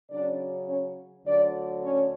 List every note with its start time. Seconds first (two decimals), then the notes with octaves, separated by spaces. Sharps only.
0.10 C#3 F#3 C#4 D4 D5
0.68 C#4 C#5
1.25 D2 D3 F#3 D4 D5
1.83 C#4 C#5